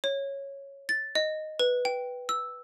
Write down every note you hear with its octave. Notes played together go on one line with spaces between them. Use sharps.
C#5
A6
D#5
B4
G5
E6